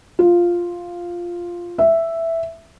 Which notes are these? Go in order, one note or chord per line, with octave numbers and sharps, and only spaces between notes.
F4
E5